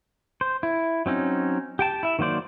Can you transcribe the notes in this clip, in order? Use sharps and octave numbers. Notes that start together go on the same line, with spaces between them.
C5
E4
F#3 C4 C#4 D#4
G4 G5 A5
E4 E5
D#3 F#3 A#3 C5 D5